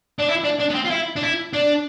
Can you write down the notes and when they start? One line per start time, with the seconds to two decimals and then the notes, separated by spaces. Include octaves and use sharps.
0.19 D4
0.29 E4
0.44 D4
0.60 D4
0.70 B3
0.75 C4
0.85 F4
0.90 E4
1.16 D4
1.23 E4
1.53 D4